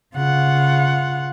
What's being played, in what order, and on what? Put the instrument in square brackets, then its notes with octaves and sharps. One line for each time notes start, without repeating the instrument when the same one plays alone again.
[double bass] C#3 [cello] F4 F#5